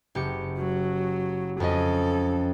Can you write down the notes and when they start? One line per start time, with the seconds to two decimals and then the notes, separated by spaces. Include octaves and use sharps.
0.15 F#1 G4 C#7
0.58 F#3
1.60 F2 C#4 A4 D#5